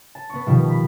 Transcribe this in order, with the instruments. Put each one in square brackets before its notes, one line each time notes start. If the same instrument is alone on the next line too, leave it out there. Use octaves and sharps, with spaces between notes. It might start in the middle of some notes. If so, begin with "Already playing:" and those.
[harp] A5
B3 C#6
B2 D#3 F3 G3
B5